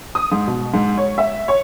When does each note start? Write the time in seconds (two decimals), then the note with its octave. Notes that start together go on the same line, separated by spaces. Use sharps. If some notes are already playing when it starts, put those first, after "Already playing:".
0.15 D#6
0.32 G#2
0.47 B2
0.74 G#2
0.97 C#5
1.18 E5
1.48 C#5